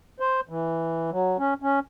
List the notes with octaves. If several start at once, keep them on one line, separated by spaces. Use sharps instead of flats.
C5
E3
F#3
C#4
C#4